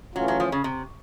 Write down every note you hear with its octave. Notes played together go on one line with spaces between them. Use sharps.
E3 F#3 A3 C#4 F4
F#3
F3
C#3
C3